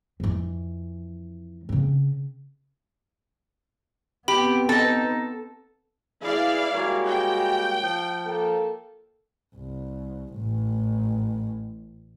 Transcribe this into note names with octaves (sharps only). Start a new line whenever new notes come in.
F2 E3
C#3 C4
B3 C4 G4 B5
D#4 A4 A5
E3 E4 G#4 D5 F5
G3 G#3 A#3 F#4 C#5
G5
F3
A#3 A4
C2
A1 A2